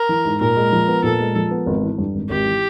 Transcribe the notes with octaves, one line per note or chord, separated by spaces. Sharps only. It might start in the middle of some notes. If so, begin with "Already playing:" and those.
Already playing: A#4
E3
G#2
A#2 A#4
G#3
F3
B3
A#2 A4
G#3
F3
B3
G#1
E3
G2
G#1
G#1 G4
E3